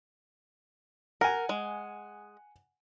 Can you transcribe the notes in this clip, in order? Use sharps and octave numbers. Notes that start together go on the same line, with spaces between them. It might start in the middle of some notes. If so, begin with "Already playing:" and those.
A#4 F#5 G#5
G#3